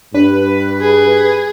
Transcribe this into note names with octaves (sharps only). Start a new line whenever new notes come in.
G2 D4 B4
G#4